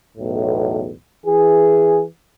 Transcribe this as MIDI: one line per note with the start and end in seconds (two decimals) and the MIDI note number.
0.18 0.91 35
0.18 0.91 40
0.18 0.91 45
1.25 2.02 52
1.25 2.02 68